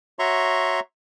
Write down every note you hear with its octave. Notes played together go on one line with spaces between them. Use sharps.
F#4 C#5 E5 A#5 C6 C#6